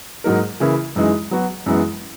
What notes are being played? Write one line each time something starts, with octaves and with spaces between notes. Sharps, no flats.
G#2 F#3 A#3 D#4 A#4
C#3 E3 A#3 C#4 E4
F#2 E3 G#3 D#4
F#3 B3 F#4
F#2 E3 G#3 B3